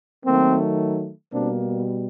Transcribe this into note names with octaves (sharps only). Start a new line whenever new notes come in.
D#3 F#3 A3 A#3 C4
B2 G3 A#3 C4 D4